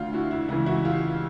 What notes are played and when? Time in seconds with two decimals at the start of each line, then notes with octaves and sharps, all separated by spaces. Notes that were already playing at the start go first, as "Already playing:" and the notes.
Already playing: D2 D3 F4
0.13 E4 F#4
0.31 E4
0.48 C#2 C#3 E3 E4
0.66 E4 F#4
0.85 F4 G4